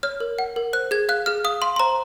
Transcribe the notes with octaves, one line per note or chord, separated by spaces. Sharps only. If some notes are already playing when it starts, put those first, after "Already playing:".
C#5 F6
A#4
F#5
A#4
C5 F#6
G#4 G#6
F5 F#6
G#4 F6
F5 D#6
F5 C6
C6
C5 A#5